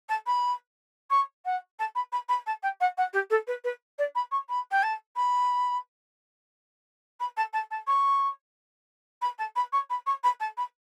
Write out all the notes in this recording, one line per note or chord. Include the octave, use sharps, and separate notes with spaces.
A5
B5
C#6
F#5
A5
B5
B5
B5
A5
G5
F#5
F#5
G4
A4
B4
B4
D5
B5
C#6
B5
G5
A5
B5
B5
A5
A5
A5
C#6
B5
A5
B5
C#6
B5
C#6
B5
A5
B5